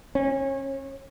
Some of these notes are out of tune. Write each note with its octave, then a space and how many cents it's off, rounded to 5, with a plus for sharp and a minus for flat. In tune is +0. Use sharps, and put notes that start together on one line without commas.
C#4 -30